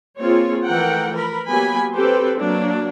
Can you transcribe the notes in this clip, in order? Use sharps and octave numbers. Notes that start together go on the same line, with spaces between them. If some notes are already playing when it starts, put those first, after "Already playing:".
A#3 C4 F4 G#4 C#5
E3 F3 A3 A#4 F#5 G5
A#4 B4 B5
F#3 A#3 B3 G4 G#5 B5
C4 G4 A4 B4 C5
F#3 A#3 D4